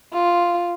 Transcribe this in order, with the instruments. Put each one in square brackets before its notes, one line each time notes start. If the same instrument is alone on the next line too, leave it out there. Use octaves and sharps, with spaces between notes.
[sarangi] F4